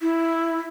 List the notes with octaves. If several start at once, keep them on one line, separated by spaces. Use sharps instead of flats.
E4